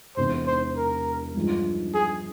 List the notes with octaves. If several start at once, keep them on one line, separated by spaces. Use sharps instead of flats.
E1 E2 C3 C5
C5
A#4
G2 F3 G#3
G#4